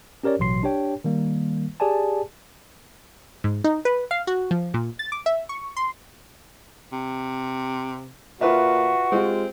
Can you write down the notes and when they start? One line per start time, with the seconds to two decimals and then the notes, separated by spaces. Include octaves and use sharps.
0.23 C#4 G4 A#4 C#5 D5
0.39 A1 B2 F#3 C6 C7
0.63 D4 G4 C#5 G5
1.04 D#3 G3 A#3
1.80 G4 G#4 D5 G#5 A5
3.44 G#2
3.64 D#4
3.85 B4
4.11 F5
4.27 F#4
4.51 F3
4.74 A#2
4.99 A6
5.12 D6
5.26 E5
5.49 C#6
5.77 C6
6.92 C3
8.41 A#2 F4 F#4 B4 E5
9.12 G#3 C4 F4 G4